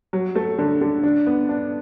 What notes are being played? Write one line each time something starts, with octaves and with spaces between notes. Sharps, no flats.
F#3
A3
D3
D3
D4
B3
D4